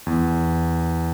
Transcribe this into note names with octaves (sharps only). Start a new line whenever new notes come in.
E2